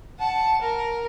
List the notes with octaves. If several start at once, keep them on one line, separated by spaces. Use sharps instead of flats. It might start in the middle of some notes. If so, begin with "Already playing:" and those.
F#5 A5
A#4